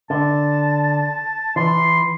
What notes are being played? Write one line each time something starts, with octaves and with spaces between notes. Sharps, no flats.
D3 A5
E3 C6